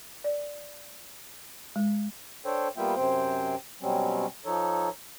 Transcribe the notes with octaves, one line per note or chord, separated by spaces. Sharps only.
D5
G#3
D4 A4 C5 C#5 G5
G3 A#3 B3 F4 E5 G5
F#2 C3 C4 C5 G5
B2 F#3 G3 C4 C#4
F3 D#4 A4 C#5